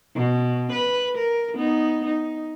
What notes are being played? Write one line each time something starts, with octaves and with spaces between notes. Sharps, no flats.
B2
B4
A#4
B3 D#4
D#4